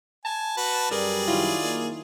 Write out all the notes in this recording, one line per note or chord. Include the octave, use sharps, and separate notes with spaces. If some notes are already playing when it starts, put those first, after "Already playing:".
G#5 A5
F#4 B4
F#2 G3 G#4 A#4 B4 D5
D#3 F#3 E4 F4
A#3